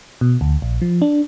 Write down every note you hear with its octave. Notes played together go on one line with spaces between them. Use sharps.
B2
D2
A#1
F3
D4